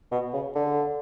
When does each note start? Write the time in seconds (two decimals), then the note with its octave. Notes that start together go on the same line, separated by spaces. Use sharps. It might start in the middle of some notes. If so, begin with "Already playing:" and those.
0.11 B2
0.33 C#3
0.55 D3